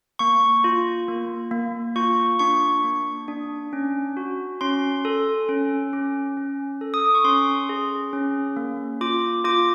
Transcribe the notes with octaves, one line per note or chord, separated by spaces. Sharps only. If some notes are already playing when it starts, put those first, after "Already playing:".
A#3 C#6
F4
A#3
A#3
F4 C#6
D4 C#6
A#3
D4
C#4
F#4
C#4 C6
A4
C#4
C#4
C#4
A4
D#6
D6
C#6
C#4 C6
G#4
C#4
A#3
F4 D6
F4 D6